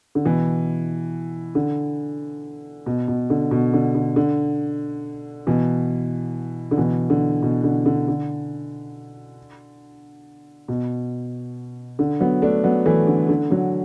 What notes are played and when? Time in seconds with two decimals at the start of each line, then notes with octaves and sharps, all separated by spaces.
0.15 D3
0.25 B2 E3
1.55 D3
2.86 B2
3.08 B2
3.30 D3
3.51 B2
3.74 D3
3.95 D3
4.16 D3
5.47 B2 E3
6.71 D3
6.77 B2 E3
7.10 D3
7.43 B2
7.64 D3
7.86 D3
8.08 D3
10.68 B2
11.99 D3
12.20 F#3 B3
12.42 A3 D4
12.64 F#3 B3
12.86 E3 A3
13.07 D3
13.29 D3
13.51 D3 F#3